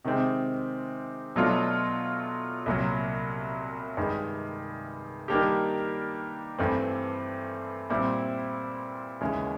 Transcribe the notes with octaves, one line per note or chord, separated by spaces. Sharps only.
C3 D#3 G#3 C4
B2 F#3 A3 D4 F4
C2 A#2 F#3
G2 D#3 G#3
D#3 G3 A#3 D4 G4
G2 E3 A3 C4
A#2 G3 C4 E4
D#2 C#3 E3 G#3